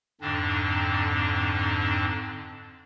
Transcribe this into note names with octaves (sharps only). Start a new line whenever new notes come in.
F2 G#2 D3 C4 D4